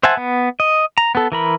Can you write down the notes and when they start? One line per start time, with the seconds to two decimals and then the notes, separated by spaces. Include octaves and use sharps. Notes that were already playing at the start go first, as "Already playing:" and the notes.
0.03 C5 E5 F#5 G#5 A5
0.17 B3
0.60 D#5
0.98 A#5
1.15 B3 A4
1.32 E3 A#4 B5